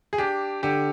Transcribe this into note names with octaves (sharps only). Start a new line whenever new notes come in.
G#4
D4 G4
D3 G4